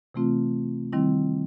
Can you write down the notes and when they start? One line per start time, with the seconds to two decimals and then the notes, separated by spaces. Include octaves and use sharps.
0.14 C3 E3 A3 C4 F4
0.93 D#3 G3 C4 E4